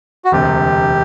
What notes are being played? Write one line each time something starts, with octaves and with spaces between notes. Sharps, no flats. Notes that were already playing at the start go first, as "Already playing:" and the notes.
F#4
E1 D2 C3 G4